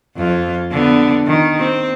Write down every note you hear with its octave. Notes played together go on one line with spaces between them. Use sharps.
F2 F4
D3 B3
D#3
C4